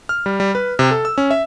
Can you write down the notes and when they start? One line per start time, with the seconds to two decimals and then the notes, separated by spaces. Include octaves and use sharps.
0.09 F6
0.26 G3
0.40 G3
0.55 B4
0.79 C3
0.91 A4
1.05 E6
1.18 C#4
1.31 E5